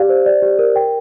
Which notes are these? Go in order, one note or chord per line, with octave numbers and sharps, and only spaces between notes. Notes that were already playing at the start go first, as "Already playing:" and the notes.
Already playing: G4 D5 F5
C5
D5
G4
A#4
G5